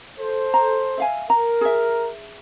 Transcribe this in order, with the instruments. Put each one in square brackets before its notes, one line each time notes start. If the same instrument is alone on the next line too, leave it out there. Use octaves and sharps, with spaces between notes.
[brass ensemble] A4 C5
[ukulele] A#5
E5 F5 G#5
[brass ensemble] A#4 [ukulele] A#5
[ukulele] G#4 E5